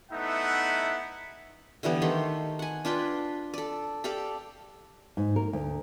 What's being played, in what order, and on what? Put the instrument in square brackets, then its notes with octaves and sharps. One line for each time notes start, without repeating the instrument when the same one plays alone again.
[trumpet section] A3 B3 D#4 E4 E5 F#5
[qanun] D3 E3 G3 B3
D#3 A3 G4 C6
F#5 G#5
D4 F4 B4 G5
A4 D5
G4 A4 D5 F5
[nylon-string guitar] G#2
A#4
D2